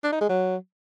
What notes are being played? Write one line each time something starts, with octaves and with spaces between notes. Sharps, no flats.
D4
D#4
G#3
F#3